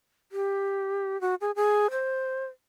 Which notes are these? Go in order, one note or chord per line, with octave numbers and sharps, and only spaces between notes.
G4
F#4
G#4
G#4
C5